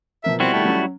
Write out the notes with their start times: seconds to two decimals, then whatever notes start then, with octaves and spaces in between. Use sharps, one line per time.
0.24 B2 F3 A#4 E5
0.40 G3 C4 E4 F#4
0.54 D#3 A3 G5
0.65 F#3 C#4